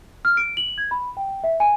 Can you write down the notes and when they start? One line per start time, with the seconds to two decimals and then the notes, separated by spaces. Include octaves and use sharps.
0.25 F6
0.37 D7
0.57 F#7
0.78 G#6
0.91 B5
1.17 G5
1.44 E5
1.60 G#5